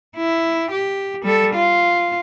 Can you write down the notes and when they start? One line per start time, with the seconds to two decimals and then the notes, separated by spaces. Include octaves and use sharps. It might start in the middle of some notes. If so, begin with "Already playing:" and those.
0.16 E4
0.71 G4
1.24 G3 A4
1.55 F4